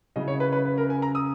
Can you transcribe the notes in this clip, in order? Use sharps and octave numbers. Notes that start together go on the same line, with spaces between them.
C#3 F#3 C#4 E4 D#5
C#5
B4
B4
B4
A#4
G#5
A#5
D#6